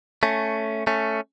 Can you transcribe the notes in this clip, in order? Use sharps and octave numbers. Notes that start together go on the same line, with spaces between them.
A3 C#4
A3 C#4